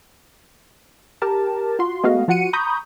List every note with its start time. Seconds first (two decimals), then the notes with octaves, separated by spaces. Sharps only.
1.22 G4 A#4 A5
1.79 F4 F#4 C6
2.04 G#3 A3 B3 F#4 D#5 F5
2.28 F3 F4 F#4 F#5 C#7 D#7
2.53 A#5 B5 C#6 D#6 G6